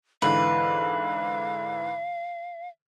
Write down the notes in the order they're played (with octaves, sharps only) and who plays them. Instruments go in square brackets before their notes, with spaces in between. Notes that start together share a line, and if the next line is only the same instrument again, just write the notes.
[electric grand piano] G#2 D3 E3 [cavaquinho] B4 [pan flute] F5